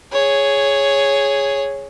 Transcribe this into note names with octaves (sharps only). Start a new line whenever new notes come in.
G#4 C#5